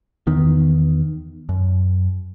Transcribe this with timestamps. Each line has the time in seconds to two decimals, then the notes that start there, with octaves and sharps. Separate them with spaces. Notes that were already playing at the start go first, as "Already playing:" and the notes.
0.27 E2 D#3 B3
1.49 F#2